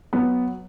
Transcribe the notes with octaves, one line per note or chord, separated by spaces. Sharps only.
F#3 B3